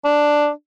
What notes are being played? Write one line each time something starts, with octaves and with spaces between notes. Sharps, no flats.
D4